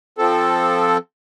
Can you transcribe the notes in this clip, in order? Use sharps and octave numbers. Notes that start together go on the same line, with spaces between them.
F3 C4 A4